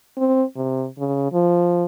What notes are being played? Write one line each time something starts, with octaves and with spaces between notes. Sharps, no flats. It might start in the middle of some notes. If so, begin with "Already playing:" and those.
C4
C3
C#3
F3